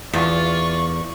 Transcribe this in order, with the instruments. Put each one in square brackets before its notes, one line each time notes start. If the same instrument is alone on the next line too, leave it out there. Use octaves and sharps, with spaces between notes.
[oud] E2 [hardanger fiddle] F4 [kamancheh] D5 C#6